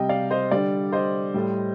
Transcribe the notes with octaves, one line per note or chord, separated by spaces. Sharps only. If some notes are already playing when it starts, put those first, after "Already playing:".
Already playing: C3 G3 D#5 G5
D5 F5
C5 D#5
D3 G3 D5
C5 D#5
A2 G3